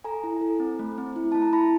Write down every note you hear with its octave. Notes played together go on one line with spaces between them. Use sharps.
A4 G#5 A#5
E4
A4
C4
A3
C4
E4
A3 A5
A#5
E4 A5 B5